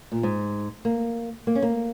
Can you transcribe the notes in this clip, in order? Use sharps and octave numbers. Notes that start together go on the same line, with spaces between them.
A#2
G#2
A#3
A#3
C#4
A#3